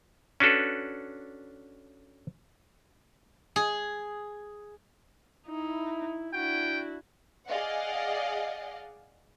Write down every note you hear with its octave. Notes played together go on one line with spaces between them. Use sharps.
C#4 D4 F#4 A4 B4
G#4
D#4 E4
D4 E4 F#4 G5
G#4 D5 D#5 F5 F#5